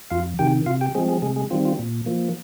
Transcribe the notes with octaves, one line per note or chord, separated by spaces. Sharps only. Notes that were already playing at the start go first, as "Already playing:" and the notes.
F2 F4 F5
C3 D#3 G4 G5
C3 F4 F5
G4 G5
F3 G#3 C4 G#4
G#3 G#4
C3 G#3 G#4
G#3 G#4
D#3 G3 C4 F4
F4
A#2
F3 A#3